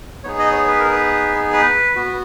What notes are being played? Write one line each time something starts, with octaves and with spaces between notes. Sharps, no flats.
B3 D#4 G#4 C#5
D#5
C#5
B4
A#4
B4
B4
B3 F#4